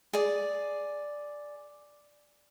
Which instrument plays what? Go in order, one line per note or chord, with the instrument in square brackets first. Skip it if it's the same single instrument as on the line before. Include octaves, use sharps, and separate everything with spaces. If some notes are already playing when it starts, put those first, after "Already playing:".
[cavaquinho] G#4 D5